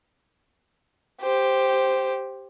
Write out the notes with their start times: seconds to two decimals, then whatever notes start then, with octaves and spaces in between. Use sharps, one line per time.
1.21 G4 C5